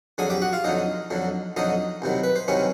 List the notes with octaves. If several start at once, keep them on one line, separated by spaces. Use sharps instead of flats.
F2 D3 F#3 G#4 G#5
G4 G5
F#4 F#5
F4 F5
F2 D3 F#3 D#4 D#5
F2 D3 F#3
F2 D3 F#3 D#4 D#5
C2 C3 D#3 F#3
B4
C5
C2 C3 D#3 F#3 C#4 C#5